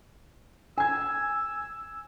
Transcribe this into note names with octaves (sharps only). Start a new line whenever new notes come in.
G#5 E6 G#6